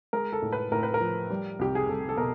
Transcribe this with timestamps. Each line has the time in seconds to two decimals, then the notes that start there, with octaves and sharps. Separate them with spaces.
0.13 G#3 A#4
0.33 A4
0.42 A2
0.52 B4
0.72 A2 A#4
0.83 B4
0.94 A#4
1.01 F3
1.30 G3
1.59 C2 G4
1.75 G#4
1.89 C2 A4
2.09 A4
2.18 B2 A#4